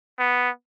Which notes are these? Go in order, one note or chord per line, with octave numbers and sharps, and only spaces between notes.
B3